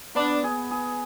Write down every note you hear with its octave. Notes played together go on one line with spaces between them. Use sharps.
B3 D4
G#4
G#4